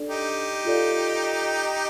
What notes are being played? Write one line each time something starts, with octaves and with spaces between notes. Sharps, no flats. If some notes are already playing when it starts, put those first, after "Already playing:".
Already playing: D4 A4 D5
D#4 G4
F4 A4 D5 F5